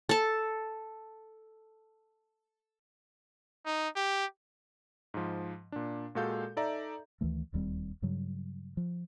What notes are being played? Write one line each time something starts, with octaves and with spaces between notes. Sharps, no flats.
A4 A5
D#4
G4
G#2 F3
A#2 D4
A#2 G#3 F#4 A4 F5 G6
D#4 A4 D5 E5 A#5
D2 D#3 E3 A3
D1 D#2 G3 C4
G2 C#3 F#3 G3
F3